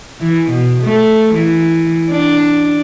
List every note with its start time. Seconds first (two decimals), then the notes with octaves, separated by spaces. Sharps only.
0.20 E3
0.50 B2
0.83 A3
1.34 E3
2.10 D4